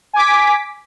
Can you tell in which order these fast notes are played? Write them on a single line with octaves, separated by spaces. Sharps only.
G#5 D6 B6